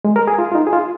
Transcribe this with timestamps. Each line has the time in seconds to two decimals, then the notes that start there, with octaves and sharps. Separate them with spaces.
0.05 G#3
0.16 A#4
0.28 G#4
0.38 F4
0.52 F4
0.55 D#4
0.67 G#4
0.73 F4